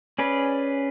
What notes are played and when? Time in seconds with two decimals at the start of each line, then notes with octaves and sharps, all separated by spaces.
0.18 C#4 G#4 B4 D5